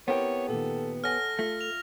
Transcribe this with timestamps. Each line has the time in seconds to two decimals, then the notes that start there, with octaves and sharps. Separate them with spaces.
0.08 B3 C4 E4 G4 A#4 C#5
0.48 A#2 D#3 A4
1.04 A4 C#5 F#5 G#5 F6 A#6
1.39 A3 F4
1.61 F7